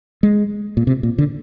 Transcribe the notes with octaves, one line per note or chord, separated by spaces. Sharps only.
G#3
A#2
C3
A#2
D3